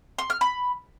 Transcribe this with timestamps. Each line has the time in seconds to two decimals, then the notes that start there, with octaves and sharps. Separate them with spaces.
0.18 C6
0.30 F6
0.41 B5